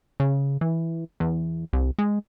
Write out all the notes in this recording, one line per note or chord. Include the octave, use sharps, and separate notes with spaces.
C#3
E3
E2
C2
G#3